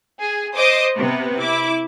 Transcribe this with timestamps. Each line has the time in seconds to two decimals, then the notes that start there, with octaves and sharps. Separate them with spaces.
0.21 G#4
0.54 C5 D#5 D6 D#6
0.95 C3 B3 B4
1.39 E4 D6